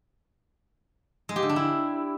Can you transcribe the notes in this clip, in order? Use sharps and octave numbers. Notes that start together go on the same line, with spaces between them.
G#3
G4
D3
D4
E4